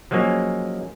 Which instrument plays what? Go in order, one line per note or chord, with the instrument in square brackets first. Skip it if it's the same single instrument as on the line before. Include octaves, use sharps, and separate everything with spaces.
[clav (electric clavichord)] F3 F#3 G#3 A#3 C#4